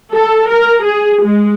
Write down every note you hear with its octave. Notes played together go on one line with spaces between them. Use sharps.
A4
A#4
G#4
G#3